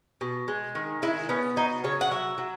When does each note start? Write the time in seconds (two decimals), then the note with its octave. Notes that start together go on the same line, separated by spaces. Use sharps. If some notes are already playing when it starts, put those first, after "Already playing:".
0.21 B2
0.48 G#3
0.75 D#3
1.02 G#3 E4
1.29 B3 C#4
1.56 F#3 D#4
1.84 C#3 C#5
2.01 F#5
2.11 F#3 E5
2.38 F#3